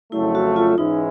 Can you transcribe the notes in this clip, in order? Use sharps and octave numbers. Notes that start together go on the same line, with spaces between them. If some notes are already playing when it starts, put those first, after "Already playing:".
F2 C#3 F#3 A3 E4
F#4
F4
G#2 E3 G#3 C#4 D#4 E4